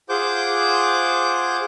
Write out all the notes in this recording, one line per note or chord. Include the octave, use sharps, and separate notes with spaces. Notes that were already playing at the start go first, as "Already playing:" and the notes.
F4 G#4 C5 F#5 D6 G6